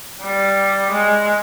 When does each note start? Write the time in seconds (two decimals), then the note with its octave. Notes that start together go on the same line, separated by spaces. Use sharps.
0.24 G3
0.92 G#3